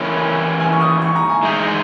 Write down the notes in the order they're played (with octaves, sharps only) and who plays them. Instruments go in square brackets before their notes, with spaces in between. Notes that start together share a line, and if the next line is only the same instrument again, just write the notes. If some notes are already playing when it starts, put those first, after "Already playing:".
Already playing: [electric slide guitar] E3 A#3 C#4 [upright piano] C#5
[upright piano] G#5
C#6
D#6
C#6
A#5
G#5
[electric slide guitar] E3 G#3 D#4 G#4 [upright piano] E5
[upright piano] D#5